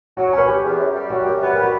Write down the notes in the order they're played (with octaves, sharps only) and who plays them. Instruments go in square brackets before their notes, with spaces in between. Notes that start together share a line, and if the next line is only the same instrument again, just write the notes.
[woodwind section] F#3 [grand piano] F#4
[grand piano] C#5
[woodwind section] C#4 [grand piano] B4
[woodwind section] C#4 [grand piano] G4
[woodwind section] E2
F#2
G3
[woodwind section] F#2 [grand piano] F#4
[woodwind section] F#2 [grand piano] G4
[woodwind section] B3 [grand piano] G4
[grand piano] A#4
[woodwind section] G3
[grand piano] F#4